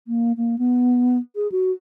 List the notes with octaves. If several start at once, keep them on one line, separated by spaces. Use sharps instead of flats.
A#3
A#3
B3
G#4
F#4